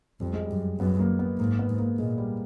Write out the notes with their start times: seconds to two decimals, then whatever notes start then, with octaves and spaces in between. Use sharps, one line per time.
0.20 F2 G3
0.34 G#3
0.46 G3
0.51 F#2
0.79 F#2 B3
1.00 A#3
1.19 B3
1.39 G#2 A#3
1.59 B3
1.69 G#2
1.79 A#3
1.99 A#2 G#3
2.18 G3